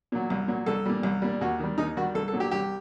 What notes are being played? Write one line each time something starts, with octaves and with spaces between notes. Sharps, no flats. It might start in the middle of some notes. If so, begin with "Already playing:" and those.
A#2 F#3
C2
A#2 F#3
C2 A4
A#2 G3
C2
A#2 G3
D#2 F#4
D#3 G3
D#2 D#4
D#3 G3 F#4
C2 A4
A4
A#2 F#3
G4
C2 G4